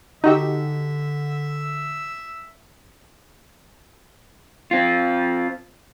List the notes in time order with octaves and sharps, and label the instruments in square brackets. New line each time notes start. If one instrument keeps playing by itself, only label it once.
[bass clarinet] D3 [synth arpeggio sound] D#4 F#4 G4 [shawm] E5
[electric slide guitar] C4 F4